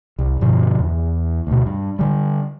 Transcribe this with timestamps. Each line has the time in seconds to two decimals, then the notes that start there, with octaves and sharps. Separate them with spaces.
0.19 C2
0.41 G2 B2 D3 F3
0.79 E2
1.47 D2 B2
1.66 G2
1.99 D3 G3